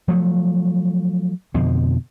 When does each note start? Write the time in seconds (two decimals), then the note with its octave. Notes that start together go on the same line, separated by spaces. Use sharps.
0.08 F3 F#3 A3
1.54 F2 B2 D3 F3